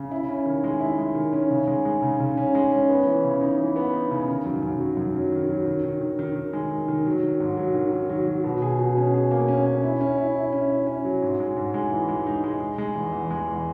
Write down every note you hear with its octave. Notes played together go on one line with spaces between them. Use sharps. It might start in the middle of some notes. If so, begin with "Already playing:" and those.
Already playing: C#3
E4
C#4
D#3
G#3
E4
G#3
D#3
C#4
C#3
G#3
G#3
C#3
C#3
C#4
G#3
C#4
B3
E3
C#3
D#4
E3
B3
D#4
C#3
D#3
F#2
F#2
F#3
F#2
F#3
D#3
F#3
D#3
D#3
D#3
D#3
D#3
G#3
D#3
D#3
F#3
D#3
G#2
F#3
D#3
D#3
F#3
F#3
B2
G#4
B2
C#4
G#4
A#3
C#4
C#4
E4
C#4
E4
E4
C#4
E4
C#4
F#3
G#2
G#3
G#2
G#3
E3
G#3
D#4
G#3
G#3
G#3
E2
E2
G#3
E2